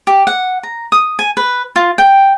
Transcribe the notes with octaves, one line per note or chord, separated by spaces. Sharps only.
G4
F#5
A#5
D#6
G#5
B4
F4
G5